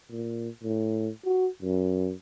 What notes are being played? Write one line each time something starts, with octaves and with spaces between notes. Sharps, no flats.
A#2
A2
F#4
F#2